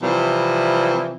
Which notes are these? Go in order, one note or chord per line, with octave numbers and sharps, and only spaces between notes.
C3 E3 F3 G3